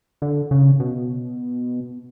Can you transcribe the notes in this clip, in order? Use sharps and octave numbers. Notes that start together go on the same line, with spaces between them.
D3
C#3
B2